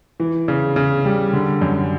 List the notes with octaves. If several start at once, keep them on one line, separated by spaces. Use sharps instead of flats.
E3
C#3
C#3
G3
D3
F#2